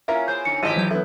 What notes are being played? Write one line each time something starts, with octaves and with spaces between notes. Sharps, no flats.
A#3 C#4 E4 F4 A#4 E5
B3 G#4 C5 G6
D3 C#4 D#4 C#7
G#1 F3 E4 G4 C5 D#5 B6 D#7
E3 F#3 G6
B3 E4 A4